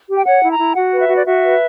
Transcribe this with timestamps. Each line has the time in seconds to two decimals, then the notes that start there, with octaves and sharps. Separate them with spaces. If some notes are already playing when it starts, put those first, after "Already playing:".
0.08 G4
0.17 G5
0.25 C#5 F#5
0.42 E4
0.51 A#5
0.59 E4
0.75 F#4 F#5
0.92 B4
1.00 E5
1.09 F#4
1.17 D5
1.26 F#4 E5
1.43 B4